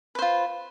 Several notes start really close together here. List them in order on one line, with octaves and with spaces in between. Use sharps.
B4 C5 F4